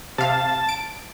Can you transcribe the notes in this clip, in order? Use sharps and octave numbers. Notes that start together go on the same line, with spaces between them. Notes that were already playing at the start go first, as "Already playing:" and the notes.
C3 F5 A5
D7